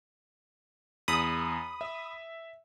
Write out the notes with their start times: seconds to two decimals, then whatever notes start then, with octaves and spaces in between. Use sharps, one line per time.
1.08 E2 B5 D#6
1.81 E5